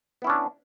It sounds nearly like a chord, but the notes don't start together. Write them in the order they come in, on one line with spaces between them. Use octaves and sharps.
B3 E4 C#4 D4